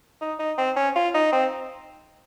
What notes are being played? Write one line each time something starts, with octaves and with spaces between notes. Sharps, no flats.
D#4
D#4
C4
C#4
F4
D#4
C4